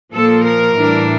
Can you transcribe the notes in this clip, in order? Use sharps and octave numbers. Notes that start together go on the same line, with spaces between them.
A#2 F3 A#3 A4
A#4
A2 E3 G3 D4